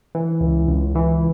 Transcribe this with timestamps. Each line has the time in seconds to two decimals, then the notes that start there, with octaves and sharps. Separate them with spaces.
0.15 E3
0.40 C#2
0.68 C#2
0.95 E3